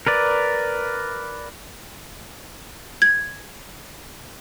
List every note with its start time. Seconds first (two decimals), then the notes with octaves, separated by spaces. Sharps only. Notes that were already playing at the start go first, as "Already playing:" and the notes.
0.07 A#4 B4 D5
3.02 G#6